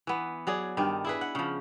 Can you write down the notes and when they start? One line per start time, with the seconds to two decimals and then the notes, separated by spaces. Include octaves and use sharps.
0.07 E3 B3
0.47 F#3 G#4 D5
0.77 G2 D#3 D#4 D5
1.05 E4 G#4 B4
1.21 F#5
1.35 C#3 F3